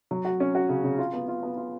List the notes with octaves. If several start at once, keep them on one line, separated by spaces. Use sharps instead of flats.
F#3
F#4
C#4
F#4
C#3
C#3
F4
B3
F4
B3
F4